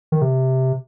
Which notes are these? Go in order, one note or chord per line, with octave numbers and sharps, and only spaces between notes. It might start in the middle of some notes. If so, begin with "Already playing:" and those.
D#3
C3